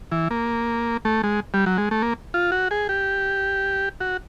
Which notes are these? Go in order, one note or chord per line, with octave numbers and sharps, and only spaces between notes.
E3
A#3
A3
G#3
G3
F#3
G#3
A3
A#3
F4
F#4
G#4
G4
F#4